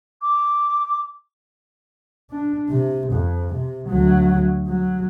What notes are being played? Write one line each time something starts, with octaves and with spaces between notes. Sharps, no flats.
D6
D4
C3
F2
C3
D2 F#3
F#3